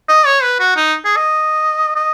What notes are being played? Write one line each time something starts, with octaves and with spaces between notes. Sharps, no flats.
D#5
C#5
B4
F#4
D#4
G#4
D#5
D#5